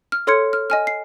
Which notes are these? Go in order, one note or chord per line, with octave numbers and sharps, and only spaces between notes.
F6
A4 C#5 C6 F6 G#6 C#7
F6
D#5 G#5 F6
C7